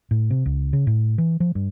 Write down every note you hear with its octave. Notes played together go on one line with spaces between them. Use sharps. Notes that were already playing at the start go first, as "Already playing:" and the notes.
A2
C3
C#2
C#3
A2
E3
F3
G2